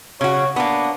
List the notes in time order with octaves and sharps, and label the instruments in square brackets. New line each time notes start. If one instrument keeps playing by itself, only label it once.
[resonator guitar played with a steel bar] C#3 F#4 [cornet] C#5
[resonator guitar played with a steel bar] A#3 B3 [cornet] D4